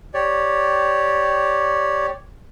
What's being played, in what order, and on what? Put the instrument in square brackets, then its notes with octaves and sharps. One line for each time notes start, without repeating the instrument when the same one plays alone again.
[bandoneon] G4 C#5 D5